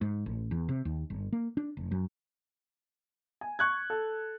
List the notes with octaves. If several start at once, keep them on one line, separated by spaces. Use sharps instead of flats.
G#2
A1
E2
C3
D#2
G1
A#3
D4
F1
F#2
G#5
C#6 F#6 G#6
A4